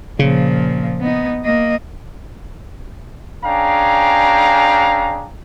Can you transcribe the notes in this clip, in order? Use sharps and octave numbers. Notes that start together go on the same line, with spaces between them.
A#2 C#3 F3
B3 D#4
A#3 D#5
C#4 D4 G#4 F5 G5 A#5